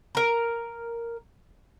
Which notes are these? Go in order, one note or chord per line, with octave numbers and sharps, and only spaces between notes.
A#4 A#5